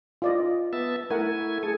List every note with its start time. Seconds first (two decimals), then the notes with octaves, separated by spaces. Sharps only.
0.22 F4 D5 D#5
0.73 B3 E5 A5
1.10 A3 E4 A#4 F#5 G#5
1.63 G#4 A4 G#5